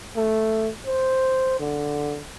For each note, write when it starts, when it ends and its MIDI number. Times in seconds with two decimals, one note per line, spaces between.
0.16 0.69 57
0.86 1.57 72
1.60 2.21 50